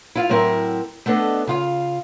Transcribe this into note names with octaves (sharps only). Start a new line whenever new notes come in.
E4 F4 F5
A2 F#3 C4 E4 A#4
A3 B3 D4 A4 D#5
C#3 F4 F5